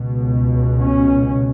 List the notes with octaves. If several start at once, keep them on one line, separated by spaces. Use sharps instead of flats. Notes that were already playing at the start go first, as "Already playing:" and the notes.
Already playing: C#2 B2
C#4